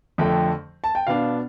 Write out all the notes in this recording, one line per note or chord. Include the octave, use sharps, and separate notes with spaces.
F2 D3 A3 G5
A5
G5
B2 B3 D4 F5